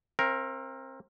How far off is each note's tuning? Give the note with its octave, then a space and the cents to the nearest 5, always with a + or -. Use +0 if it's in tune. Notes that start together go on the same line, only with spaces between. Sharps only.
C4 +30 A#4 +0 F5 -35